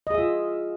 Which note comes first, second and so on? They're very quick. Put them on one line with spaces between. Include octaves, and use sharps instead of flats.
D#5 G#4 E5 F4